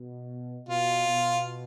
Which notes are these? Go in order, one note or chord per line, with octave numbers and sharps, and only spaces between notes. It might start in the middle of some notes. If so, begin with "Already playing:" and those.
Already playing: B2
B2 F4
B2